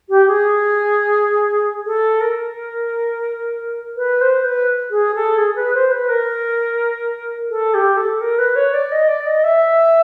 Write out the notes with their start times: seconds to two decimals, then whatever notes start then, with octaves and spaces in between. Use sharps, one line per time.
0.09 G4
0.27 G#4
1.86 A4
2.21 A#4
3.97 B4
4.21 C5
4.44 B4
4.91 G#4
5.15 A4
5.38 G#4
5.56 B4
5.74 C5
5.91 B4
6.09 A#4
7.50 A4
7.74 G4
7.97 A4
8.21 A#4
8.38 B4
8.56 C#5
8.74 D5
8.92 D#5
9.08 D5
9.26 D#5
9.44 E5